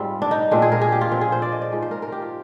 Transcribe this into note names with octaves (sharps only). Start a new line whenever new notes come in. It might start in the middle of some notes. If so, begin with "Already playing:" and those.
Already playing: G#2 G3 C4 F4
D4
D#4
A#2 G#3 C4 D4
G#4
A#4
G#4
G4
F4
A#2 F3 C4
G#4
C5
D5
D#5
D5
G#2 F3 G#3
C5
A#4
A#4
G4
F4